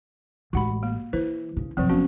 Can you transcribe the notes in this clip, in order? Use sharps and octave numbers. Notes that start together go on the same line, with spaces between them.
A1 G#3 F#4 F#5 B5
A#3
E3 E4 B4 C5
C#3
F1 F3 F#3 C4
F1 B3 C#4 F#4